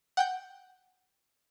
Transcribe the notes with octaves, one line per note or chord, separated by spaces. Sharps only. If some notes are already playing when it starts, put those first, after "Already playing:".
F#5 G5 G6